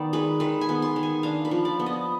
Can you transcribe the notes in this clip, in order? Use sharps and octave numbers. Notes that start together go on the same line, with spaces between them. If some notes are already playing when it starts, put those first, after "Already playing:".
Already playing: D#3 B3 D5
G#3 B4
D#3 B4
G#5
B3
C6
D#3
G#5
D4 F5
B4
F3
D5
B3
D#5